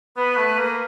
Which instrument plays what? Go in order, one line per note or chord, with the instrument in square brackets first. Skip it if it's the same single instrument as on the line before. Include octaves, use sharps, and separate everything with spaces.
[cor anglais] B3 [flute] B4
[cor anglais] A3
A#3